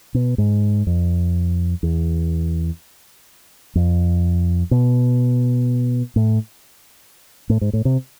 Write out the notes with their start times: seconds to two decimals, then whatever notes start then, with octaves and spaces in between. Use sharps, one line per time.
0.14 B2
0.38 G#2
0.87 F2
1.83 E2
3.75 F2
4.71 B2
6.16 A2
7.49 A2
7.61 G#2
7.73 A2
7.85 C3